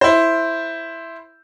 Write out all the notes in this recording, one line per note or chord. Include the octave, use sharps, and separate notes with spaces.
E4 C5